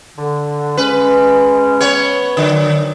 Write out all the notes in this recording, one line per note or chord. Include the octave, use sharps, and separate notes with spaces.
D3
G#3 C#4 B4
B3 C#5
D3 F#3 D5